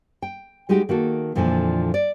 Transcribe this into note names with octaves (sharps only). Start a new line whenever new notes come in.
G5
G3 G#3 D#4 F#4 G4
D#3 A#3 F#4 A4
F2 A#2 D3 E3 F3
D5